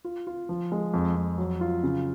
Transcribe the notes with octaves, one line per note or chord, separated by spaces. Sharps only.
F4
F4
F3
G#3
F2
F2
F#3
F4
C#3